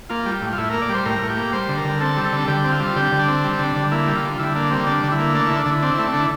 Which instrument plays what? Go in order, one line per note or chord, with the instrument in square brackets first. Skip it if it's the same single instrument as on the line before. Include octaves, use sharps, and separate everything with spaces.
[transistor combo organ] A#3 F4
G3
A2
F4
A2 E4
A#3 A#4
D5
G3 C5
A2 A#4
A2
G4
A#3
G3 C5
D3
A#4
D3
C4 A4
G3
A4
D3
D3 G4
C4
F4
G3
D3 G4
D3
D4
C4
G3
D3
D3
A#3 E4
G3
F4
D3
D3 E4
A#3 D4
G3 C4
D3 D4
D3
E4
A#3
A3 D4
D3 E4
D4
D3
E4
C4 D4
A3 E4
D4
D3
E4